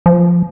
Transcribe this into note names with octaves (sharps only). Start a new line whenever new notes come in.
F3